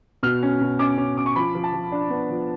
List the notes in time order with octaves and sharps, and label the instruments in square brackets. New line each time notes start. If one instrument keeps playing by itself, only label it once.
[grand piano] B2 F6
C#4
B2
C#4 D6
C#4
C#4 D6
C#6
F3 B5
F3
A5
F3
D4
B3
F3